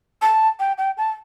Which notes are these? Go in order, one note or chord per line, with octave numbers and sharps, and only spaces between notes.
A5
G5
G5
A5